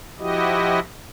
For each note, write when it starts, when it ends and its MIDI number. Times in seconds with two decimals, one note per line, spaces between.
0.19 0.80 53
0.19 0.80 64
0.19 0.80 66
0.19 0.80 67
0.19 0.80 75